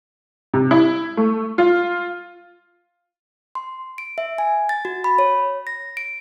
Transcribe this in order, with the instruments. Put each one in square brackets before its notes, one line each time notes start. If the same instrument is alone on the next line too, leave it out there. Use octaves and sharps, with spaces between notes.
[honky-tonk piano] C3
E4
A3
F4
[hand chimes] C6
D7
E5
G#5
A6
F#4
B5
C#5
A#6
D7